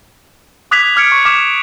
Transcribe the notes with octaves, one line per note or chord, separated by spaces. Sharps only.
D6 D#6 F#6 G#6 B6 F7
D6 F6 G#6 C#7 D7
C#6
D6 F6 B6 E7